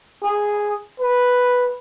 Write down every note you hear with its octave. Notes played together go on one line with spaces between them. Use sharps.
G#4
B4